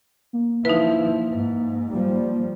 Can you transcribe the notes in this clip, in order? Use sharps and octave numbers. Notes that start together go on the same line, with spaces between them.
A#3
F3 D#4 E4 B4
G#2
F3 G3